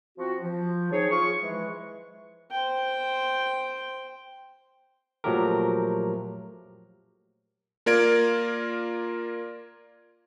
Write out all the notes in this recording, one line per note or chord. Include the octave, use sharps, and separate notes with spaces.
F3 C4 F#4
F3
C4 D#4 G#4 C#5
F4 G#4 C#6
E3 F3 G#3
C5 G5
A#2 F3 F#3 A3 G4 A#4
A#3 F4 A#4 D5 G#6 D7